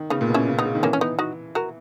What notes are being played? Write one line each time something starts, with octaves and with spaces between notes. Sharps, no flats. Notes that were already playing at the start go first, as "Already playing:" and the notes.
Already playing: D#3
C#3 B3 D#4
A#2
B2
C#4 E4
C#3
B3 D#4
C#3
D#3
E3 A#3 C#4
C#4
B3 D#4
D#4 F#4
F#4 A#4